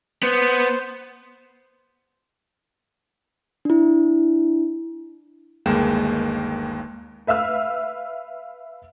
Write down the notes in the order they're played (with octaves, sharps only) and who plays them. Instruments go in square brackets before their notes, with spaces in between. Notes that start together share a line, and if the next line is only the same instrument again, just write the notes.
[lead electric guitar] B3 [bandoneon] C5
[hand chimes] D4 E4
[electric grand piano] G1 D#2 G#3 A#3 G5 E7
[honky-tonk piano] B4 E5 F5 E6 F6